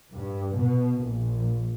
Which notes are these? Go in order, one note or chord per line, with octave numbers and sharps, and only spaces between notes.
G2
B2
A#1